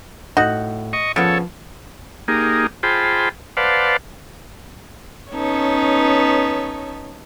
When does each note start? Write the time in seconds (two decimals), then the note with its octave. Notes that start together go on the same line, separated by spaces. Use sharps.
0.37 A2 D#4 F#4 F#5
0.93 D#5 C#6
1.16 C#3 F3 B3 A4 C#5
2.28 A#3 D#4 G4 G#4
2.83 F4 G#4 C5 G5 A5 B5
3.57 B4 C5 D5 F5 F#5 A5
5.33 B3 C#4 D#4 A4 C#5